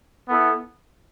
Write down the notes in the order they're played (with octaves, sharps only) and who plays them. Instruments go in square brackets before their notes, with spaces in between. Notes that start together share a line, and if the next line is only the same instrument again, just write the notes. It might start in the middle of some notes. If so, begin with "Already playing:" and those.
[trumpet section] B3 E4 A4